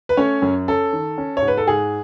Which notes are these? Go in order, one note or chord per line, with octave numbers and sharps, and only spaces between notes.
B4
A3 C#4 C#5
F#2
C#4 A4
D#3
C#4
C#5
G#2
B4
A4
G#2 G#4